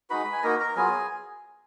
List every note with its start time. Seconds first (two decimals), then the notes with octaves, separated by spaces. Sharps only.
0.10 G#3 D#4 F#4 B4 B5
0.33 G#5
0.43 A#3 D#4 F#4 A#4 A#5
0.60 A#4 A#5
0.76 F#3 B3 F4 G#4 G#5